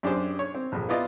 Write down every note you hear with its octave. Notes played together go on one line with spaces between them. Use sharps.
F#2 D4 G4 G#4 C5 D6
C#5
C4
A#1 F2
B3 E4 F4 D5 D#5